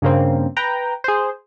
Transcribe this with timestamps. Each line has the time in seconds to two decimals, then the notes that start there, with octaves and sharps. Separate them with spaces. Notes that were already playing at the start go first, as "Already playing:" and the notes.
0.02 G2 C#3 A#3 C4
0.57 B4 G5 A#5
1.04 G#4 C5